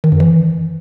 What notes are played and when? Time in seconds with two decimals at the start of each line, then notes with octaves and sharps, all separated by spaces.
0.04 D#3
0.12 F#2
0.20 E3